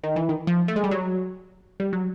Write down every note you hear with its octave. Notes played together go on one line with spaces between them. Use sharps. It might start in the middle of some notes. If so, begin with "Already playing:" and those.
D#3
E3
D#3
F3
A3
G#3
G3
F#3
G3
F#3